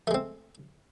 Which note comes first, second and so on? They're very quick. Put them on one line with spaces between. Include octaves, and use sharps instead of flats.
A3 G#3 C4